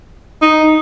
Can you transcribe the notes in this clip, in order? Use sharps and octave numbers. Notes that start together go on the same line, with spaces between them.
D#4